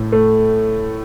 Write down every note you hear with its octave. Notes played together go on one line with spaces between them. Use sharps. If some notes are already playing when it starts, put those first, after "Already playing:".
Already playing: A2 A3
A3